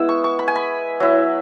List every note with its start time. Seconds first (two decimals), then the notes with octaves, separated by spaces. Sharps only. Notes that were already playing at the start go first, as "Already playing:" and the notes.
Already playing: G#3 B3 E4 E6
0.09 C#6
0.24 C#6
0.39 B5
0.48 G#5
0.56 B5
1.00 F#3 E4